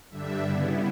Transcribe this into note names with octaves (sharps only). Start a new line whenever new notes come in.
G2 D3 G3 D4 E5
C#3 G3 B3 E4